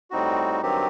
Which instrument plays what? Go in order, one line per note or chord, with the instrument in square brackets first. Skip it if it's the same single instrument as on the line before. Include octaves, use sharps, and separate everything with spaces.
[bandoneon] A2 G3 C4 D#4 F#4
G2 D#3 F#3 C4 G4